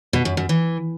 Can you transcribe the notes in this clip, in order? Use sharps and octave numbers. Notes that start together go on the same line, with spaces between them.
B2
F#2
F#2
E3